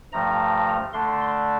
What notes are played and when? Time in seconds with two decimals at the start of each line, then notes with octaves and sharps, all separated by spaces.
0.13 G2 F3 A3 A#5
0.93 D3 A3 D4 C6